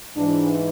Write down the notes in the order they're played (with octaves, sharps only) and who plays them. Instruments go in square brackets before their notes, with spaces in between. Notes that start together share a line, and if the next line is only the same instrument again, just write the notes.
[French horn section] G#2 E3 D4